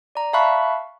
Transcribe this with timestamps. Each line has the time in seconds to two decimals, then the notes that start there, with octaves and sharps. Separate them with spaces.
0.15 D5 A#5
0.33 E5 F5 A5 B5 C#6 F#6